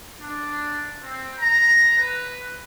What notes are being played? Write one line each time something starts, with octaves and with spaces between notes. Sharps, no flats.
D4
C4
A#5
B4